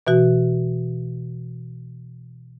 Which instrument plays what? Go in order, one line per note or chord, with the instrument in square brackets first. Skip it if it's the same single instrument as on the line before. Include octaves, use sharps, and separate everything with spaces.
[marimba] B2 E3 F#4